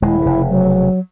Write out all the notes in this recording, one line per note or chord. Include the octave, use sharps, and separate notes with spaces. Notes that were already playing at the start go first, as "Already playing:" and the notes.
D#1 G#3 E4
F1 C#3
F#3